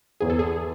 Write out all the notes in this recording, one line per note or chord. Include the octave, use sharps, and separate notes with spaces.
E2 G#4
A4
G#4